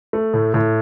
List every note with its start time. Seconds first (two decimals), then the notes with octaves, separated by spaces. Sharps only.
0.13 A3
0.34 A2
0.54 A2